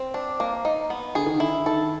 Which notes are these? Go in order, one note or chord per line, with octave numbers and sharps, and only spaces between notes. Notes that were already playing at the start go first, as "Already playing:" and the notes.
Already playing: C4
D4
A#3
D#4
B3
D3 G#4
D#3
D3
E4
D#3 A4